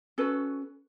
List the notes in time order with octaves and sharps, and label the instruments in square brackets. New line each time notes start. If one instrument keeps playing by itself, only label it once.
[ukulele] C#4 F#4 A4 B4